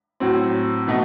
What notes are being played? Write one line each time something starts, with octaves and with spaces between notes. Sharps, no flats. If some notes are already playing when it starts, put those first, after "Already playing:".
A2 F#3 C4
B2 A3 D#4